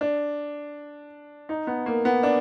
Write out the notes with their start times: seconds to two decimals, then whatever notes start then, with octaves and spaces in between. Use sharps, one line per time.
0.01 D4
1.49 D#4
1.67 B3
1.86 A#3
2.05 B3
2.23 D4